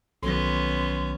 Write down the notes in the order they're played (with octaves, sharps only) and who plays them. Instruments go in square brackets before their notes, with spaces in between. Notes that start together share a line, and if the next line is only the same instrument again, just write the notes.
[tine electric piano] B1 D#3 F#3 [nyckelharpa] B3 C#4 [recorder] C6